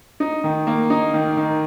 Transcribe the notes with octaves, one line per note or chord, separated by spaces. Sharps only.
D#4
D#3
A#3
D#4
D#3
D#3